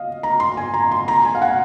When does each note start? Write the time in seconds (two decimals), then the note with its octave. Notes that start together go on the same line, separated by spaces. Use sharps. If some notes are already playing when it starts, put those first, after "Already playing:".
Already playing: D#5 F5
0.23 A#5
0.40 C6
0.57 G#5
0.74 A#5
0.91 C6
1.08 A#5
1.25 G#5
1.35 F5
1.42 F#5